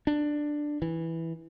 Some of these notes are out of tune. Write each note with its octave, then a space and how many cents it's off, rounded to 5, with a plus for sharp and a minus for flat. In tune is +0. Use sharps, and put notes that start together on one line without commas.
D4 +10
E3 -5